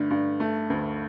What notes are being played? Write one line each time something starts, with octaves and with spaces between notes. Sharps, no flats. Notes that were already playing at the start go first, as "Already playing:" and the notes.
Already playing: G2 D3 A3
G2
A3
D2